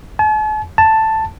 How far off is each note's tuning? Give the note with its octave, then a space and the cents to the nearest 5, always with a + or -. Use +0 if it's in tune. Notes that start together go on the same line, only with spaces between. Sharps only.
A5 -45
A5 +5